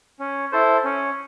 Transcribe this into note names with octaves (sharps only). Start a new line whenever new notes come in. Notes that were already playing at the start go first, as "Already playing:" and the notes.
C#4
E4 A4 C5
C#4